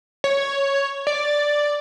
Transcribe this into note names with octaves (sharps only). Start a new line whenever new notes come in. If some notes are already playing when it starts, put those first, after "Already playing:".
C#5
D5